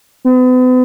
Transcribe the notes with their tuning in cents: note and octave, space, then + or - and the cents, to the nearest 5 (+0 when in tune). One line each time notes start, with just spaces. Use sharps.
B3 +40